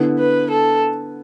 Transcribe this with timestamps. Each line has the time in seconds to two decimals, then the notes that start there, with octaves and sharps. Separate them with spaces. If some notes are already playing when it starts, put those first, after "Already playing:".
Already playing: D3 B3 E4
0.19 B4
0.51 A4